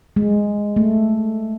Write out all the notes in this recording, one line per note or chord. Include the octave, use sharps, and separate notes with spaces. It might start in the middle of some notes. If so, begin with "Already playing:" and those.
G#3
A3